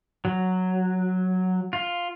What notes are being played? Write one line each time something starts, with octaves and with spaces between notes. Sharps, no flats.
F#3
F4